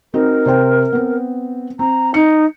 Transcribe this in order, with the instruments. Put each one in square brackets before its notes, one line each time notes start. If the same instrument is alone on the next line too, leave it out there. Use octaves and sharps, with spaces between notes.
[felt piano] C4 D#4 F#4 [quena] A#4
[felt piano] C3 C5 G5
B3 C4
[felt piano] C4 [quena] A#5
[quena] D#4 [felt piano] C#7